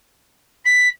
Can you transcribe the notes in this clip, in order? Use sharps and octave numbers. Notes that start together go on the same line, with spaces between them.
B6